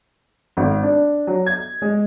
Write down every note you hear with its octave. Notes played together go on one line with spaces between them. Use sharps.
G#1
D4
F#3
G#6
G#3